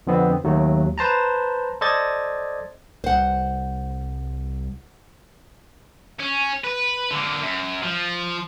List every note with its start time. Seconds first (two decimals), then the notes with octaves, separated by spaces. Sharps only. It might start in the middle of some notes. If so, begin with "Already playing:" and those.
0.07 F2 D3 B3 C4
0.44 D#2 F#3 A3
0.98 B4 C5 A5 A#5
1.81 A4 C5 D5 D#5 G#6 A6
3.04 C2 C5 F#5
6.20 C#4
6.64 B4
7.11 D3 A#3
7.42 F#2
7.83 F3